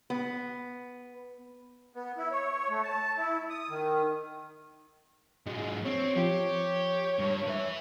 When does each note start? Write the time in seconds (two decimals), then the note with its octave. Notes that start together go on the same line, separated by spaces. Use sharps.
0.10 B3
1.95 B3
2.18 E4
2.31 C#5
2.69 A3
2.83 A5
3.17 E4
3.50 D#6
3.69 D#3
5.47 G#2 F#3 G#3
5.85 C4 C#5
6.16 F3 G4
7.19 G2
7.47 B4 E5